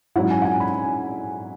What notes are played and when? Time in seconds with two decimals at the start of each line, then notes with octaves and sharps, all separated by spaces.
0.16 G#2 F#3 C#4 E4 F#5
0.31 G#5
0.42 F#5
0.45 G#5
0.60 B5